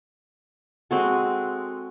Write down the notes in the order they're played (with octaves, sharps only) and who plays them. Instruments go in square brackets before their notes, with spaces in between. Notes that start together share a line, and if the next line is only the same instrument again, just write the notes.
[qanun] G#3 C4 F#4 A4